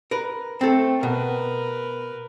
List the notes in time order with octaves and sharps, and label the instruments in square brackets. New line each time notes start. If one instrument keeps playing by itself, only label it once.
[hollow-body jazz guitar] A#4 B4
[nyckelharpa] A3 [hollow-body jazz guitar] C4 A4
[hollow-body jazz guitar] B2 [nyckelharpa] A#4 B4